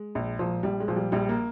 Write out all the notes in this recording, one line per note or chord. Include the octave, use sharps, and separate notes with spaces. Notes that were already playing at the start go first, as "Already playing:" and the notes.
Already playing: G#3
A#1
A#2 F3
A#1 G3
G#3
A#2 F3
G3
A#1 G3
A#3